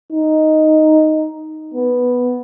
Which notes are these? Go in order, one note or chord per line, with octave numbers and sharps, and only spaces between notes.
D#4
B3